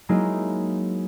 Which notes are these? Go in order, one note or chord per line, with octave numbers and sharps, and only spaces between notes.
F#3 G#3 A#3 D#4 E4